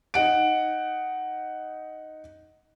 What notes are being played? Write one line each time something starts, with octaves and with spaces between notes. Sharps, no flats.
D#4 F#5 D7